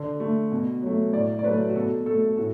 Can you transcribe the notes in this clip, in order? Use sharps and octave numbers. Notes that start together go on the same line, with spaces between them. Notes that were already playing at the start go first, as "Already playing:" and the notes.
Already playing: D3
A3
B2
F#3 A3
A2 D5
D5
F#3 A3 B4
F#4
B2 A4
A3 A4
A2 F#4